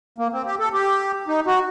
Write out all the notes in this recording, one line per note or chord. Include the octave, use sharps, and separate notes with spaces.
A#3
C4
G4
A4
G4
D#4
F#4